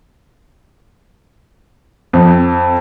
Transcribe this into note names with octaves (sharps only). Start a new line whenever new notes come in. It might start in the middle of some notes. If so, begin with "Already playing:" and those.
F2